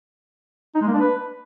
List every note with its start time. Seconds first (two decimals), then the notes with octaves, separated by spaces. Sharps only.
0.75 D#4
0.81 G#3
0.88 A#3
0.94 D4
1.00 B4